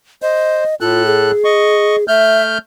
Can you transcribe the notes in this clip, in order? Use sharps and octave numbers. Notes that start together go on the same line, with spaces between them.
C5 D#5
A2 F4 A4 F#6
G#4
D#5 C#6
A3 E5 F6 G6